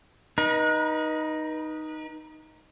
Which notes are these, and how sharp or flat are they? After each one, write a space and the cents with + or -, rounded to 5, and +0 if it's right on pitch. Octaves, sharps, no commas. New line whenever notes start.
D#4 +0 B4 -35